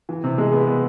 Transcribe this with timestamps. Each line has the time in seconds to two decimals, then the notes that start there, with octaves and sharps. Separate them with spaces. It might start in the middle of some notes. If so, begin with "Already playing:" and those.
0.09 E3
0.24 C3
0.38 G#3
0.53 B3
0.67 B3